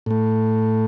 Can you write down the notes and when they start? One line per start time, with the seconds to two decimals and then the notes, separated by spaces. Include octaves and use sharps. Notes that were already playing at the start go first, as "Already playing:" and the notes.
0.06 A2 A3